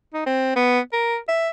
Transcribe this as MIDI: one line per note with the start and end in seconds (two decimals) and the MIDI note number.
0.14 0.24 63
0.26 0.53 60
0.56 0.79 59
0.93 1.17 70
1.28 1.50 76